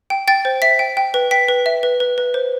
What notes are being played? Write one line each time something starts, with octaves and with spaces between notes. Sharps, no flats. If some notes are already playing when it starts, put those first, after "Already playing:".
G5
G5 A6
C5
E5 B6
G5
G5
B4
G5 B6
B4
E5
B4
B4
B4
C5